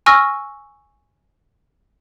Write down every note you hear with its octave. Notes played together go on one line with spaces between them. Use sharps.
G#5 C#6 E6 F6 A#6